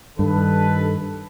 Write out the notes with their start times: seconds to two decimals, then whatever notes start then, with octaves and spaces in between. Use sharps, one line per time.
0.19 G2 D#3 A4 B4